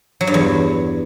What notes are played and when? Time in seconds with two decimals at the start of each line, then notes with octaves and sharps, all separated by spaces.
0.21 F#3
0.27 G2
0.34 E2